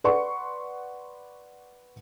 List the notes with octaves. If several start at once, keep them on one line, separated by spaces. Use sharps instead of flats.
B4 D5 F#5 C6 C#6